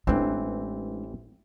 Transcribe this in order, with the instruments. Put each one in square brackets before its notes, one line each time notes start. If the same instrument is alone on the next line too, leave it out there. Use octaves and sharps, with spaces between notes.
[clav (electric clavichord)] A1 E3 C4 [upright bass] G#3 D4